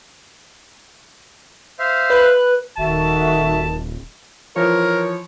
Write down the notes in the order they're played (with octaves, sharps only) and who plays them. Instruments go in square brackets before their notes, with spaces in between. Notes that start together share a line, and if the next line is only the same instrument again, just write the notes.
[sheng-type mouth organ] C5 E5 F5
[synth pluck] B4 F#6
[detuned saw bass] D#1 [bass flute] D#3 [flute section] F#4 A4 E5 [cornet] A5
[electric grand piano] E3 F3 F4 [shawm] A#4 [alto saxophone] C#5